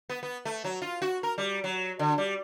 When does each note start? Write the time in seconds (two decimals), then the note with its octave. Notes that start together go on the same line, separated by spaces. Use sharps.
0.09 B3
0.23 B3
0.45 A3
0.64 F#3
0.82 F4
1.02 F#4
1.23 A#4
1.38 G3
1.64 F#3
1.99 D3
2.18 G3